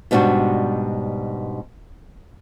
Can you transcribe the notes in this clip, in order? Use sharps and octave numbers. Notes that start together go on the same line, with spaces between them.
G#2 B2 G3 D4 F#4